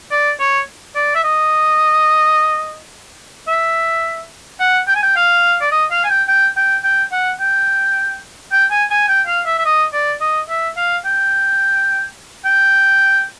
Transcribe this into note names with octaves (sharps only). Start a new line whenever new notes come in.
D5
C#5
D5
E5
D#5
E5
F#5
G5
G#5
G5
F5
D5
D#5
F5
G#5
G5
G5
G5
G5
F#5
G5
G5
G#5
G#5
G5
F5
E5
E5
D#5
D5
D#5
E5
F5
G5
G5